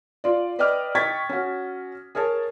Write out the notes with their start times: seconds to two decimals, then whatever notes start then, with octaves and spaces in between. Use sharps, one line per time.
0.24 F4 D5
0.59 B4 D5 D#5 G5 D6 F6
0.95 D#5 G5 C#6 G#6 A6 B6
1.29 C#4 F#4
2.15 G#4 A#4 C#5 A5